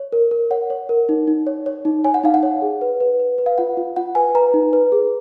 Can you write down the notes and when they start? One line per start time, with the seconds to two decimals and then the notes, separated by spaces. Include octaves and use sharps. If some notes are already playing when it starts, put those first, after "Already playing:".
Already playing: C#5
0.12 A#4
0.31 A#4
0.51 C#5 F#5
0.70 C#5
0.89 A#4
1.09 D#4
1.27 D#4
1.47 C#5
1.66 C#5
1.85 D#4
2.04 C#5 G#5
2.14 F#5
2.24 D#4 F5
2.34 F#5
2.43 C#5
2.62 G#4
2.81 B4
3.00 B4
3.20 B4
3.38 B4
3.46 F5
3.58 F4 F#5
3.77 F4
3.96 F4 F#5
4.15 B4 G#5
4.35 B4 A#5
4.54 D#4
4.73 B4
4.92 G#4